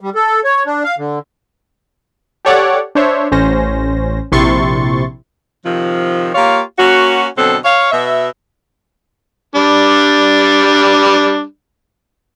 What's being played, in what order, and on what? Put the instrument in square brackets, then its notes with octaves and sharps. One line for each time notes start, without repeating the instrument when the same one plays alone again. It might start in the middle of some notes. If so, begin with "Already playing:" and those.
[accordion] G3
A4
C#5
D4
F5
D3
[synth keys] G4 A4 C#5 D5 F#5 D6
D4 C5 C#5 E5
A1 C#4 C5 A#6
A#1 C3 E4 C6 C#6 A6
[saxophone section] C3 D#3 F3
A#3 F4 G4 C#5 F5
A#3 C#4 F#4
B2 D3 F#3 C4 A4
C#5 F5
B2 E5
[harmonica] G3 D4